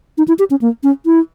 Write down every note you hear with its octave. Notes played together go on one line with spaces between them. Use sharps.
D#4
E4
G4
C#4
A#3
C#4
E4